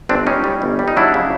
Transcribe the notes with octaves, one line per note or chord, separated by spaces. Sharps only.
G1 C4 D4
G3 C#4 D#4
G3
G1
G3
D#4
F#3 D4 E4
C#3